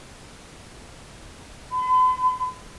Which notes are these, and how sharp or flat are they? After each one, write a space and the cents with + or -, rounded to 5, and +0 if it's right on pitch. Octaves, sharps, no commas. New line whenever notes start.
B5 +45